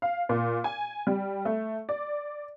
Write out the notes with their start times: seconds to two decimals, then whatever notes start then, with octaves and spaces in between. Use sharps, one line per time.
0.02 F5
0.29 A#2
0.64 G#5
1.07 G3
1.45 A3
1.89 D5